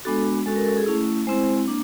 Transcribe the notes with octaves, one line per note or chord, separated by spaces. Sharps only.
G#3 B3 D4 F#4 A4
G#3 C#4 F#4 A4
A#4
A4
G#4
A3 C#4 E4
G#3 C4 E4 C5
A#3 D4